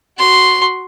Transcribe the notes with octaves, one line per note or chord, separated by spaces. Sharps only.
F#4 C6